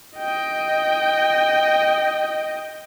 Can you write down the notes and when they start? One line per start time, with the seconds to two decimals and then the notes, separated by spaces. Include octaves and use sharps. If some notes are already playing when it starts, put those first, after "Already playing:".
0.17 D#5 G5